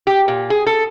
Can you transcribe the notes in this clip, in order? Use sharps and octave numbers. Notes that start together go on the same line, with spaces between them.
G4
A#2
G#4
A4